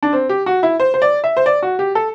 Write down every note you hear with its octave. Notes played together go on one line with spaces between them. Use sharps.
D4
C4
G4
F#4
E4
C5
C5
D5
E5
C5
D5
F#4
G4
A4